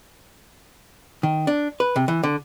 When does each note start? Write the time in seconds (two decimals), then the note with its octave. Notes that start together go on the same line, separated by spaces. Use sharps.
1.23 D#3
1.47 D4
1.80 B4
1.96 C3
2.08 E3
2.23 D3